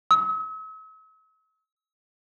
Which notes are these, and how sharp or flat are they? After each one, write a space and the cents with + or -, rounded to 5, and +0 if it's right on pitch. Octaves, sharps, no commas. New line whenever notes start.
E6 -45